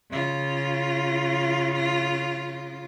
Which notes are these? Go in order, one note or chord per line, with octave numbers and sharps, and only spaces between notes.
C#3 F4